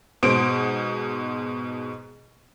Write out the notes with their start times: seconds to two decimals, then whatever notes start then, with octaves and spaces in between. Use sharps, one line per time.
0.23 G#2 B2 C5 D7